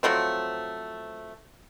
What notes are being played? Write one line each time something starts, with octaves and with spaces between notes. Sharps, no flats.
F3 F#3 A3 C4